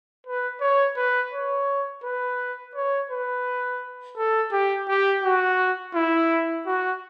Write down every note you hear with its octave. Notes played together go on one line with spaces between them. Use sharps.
B4
C#5
B4
C#5
B4
C#5
B4
A4
G4
G4
F#4
E4
F#4